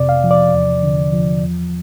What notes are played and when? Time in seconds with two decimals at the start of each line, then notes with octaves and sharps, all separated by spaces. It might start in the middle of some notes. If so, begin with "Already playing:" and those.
Already playing: F2 C3 D5
0.09 F5
0.24 F3
0.31 D5
0.53 E2
0.83 D3
1.13 F3
1.42 E2